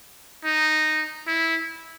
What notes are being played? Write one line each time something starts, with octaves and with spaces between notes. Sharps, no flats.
D#4
E4